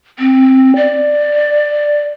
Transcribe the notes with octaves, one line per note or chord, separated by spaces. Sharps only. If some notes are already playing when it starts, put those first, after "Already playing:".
C4
D5